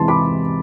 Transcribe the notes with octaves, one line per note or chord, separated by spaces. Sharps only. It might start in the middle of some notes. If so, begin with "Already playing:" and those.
Already playing: E2 C3 E3 G#3 A5 C6
B5 D6